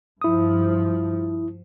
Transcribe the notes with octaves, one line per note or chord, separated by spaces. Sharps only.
G2 F3 E4 D#6